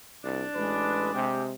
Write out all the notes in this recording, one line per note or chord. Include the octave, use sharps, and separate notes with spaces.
C2 D4
A1 G#3 B4
C3 G4